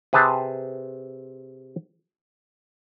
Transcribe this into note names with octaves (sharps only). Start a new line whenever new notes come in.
C3 G#4 B4 C5 A5